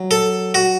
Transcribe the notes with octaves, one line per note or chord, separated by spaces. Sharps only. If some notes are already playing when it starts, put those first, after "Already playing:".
Already playing: F#3
A4
F#4